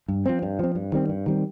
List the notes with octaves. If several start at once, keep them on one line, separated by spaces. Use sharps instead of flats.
G2
F3 C4
G2
F3 C4
G2
D#3 G3 C4
G2
D#3 G3 C4